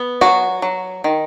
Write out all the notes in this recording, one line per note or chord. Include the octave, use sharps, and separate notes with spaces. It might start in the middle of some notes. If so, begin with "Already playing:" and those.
Already playing: B3
F#3 F#4
F#3
D#3